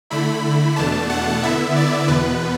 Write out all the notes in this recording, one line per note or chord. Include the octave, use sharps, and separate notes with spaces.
D3 A3 E4 B5
E2 B2 A3 D4 A5
F#5
D3 B3 E4 E5
D5
E2 B2 B3 B4